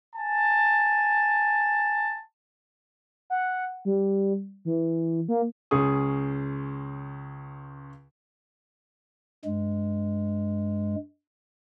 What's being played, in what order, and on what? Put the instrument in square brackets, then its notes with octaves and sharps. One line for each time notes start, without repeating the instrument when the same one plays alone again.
[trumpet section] G#5 A5
[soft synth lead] F#5
G3
E3
A#3
[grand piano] C#2 C#4 G#4 C#6 D#6
[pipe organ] G2 G#3